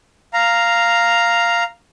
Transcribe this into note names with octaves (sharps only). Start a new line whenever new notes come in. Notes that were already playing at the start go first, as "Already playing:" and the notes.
F5 A#5